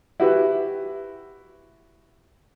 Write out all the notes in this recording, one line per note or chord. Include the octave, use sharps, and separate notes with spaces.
E4 F#4 G4 B4